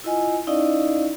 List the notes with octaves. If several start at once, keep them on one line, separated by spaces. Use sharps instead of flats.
E4 F4 D#5 G#5
C#4 D#4 E4 D5 D#5 F5